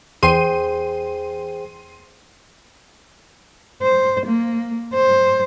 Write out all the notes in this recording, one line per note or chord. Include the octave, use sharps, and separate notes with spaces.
E2 G#4 C5 G5 C6 D#7
C5
A#3
C5